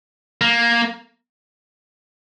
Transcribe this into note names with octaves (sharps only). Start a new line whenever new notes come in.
A#3